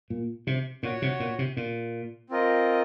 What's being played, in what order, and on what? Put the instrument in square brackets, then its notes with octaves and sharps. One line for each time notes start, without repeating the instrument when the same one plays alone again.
[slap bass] A#2
C3
[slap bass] A#2 [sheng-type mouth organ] F#4 C#5 F#5
[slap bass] C3
A#2
C3
A#2
[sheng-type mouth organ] C4 F4 A#4 D#5